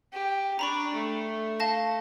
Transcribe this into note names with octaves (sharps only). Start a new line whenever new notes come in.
G4
D4 A#5 B5 C#6
A3
F5 A5 A#6